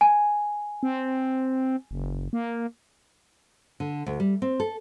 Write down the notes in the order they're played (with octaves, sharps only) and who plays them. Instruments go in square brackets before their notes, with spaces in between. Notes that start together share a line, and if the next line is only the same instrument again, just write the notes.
[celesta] G#5
[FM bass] C4
F#1
A#3
[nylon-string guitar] D3
D2
G3
C4
A4